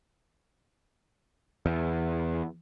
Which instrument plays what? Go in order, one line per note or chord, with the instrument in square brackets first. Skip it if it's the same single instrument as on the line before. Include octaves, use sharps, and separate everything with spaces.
[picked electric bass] E2